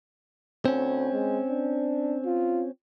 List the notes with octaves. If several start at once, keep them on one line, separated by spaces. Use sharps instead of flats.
D2 C4 C#4
G#3
D4
F4